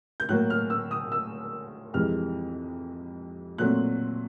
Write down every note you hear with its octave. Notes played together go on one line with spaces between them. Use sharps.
G6
A2 F#3 A#3 F#6
F6
E6
D#6
E6
F2 C3 E3 G#3 F6
A#2 F#3 A3 C4 F#6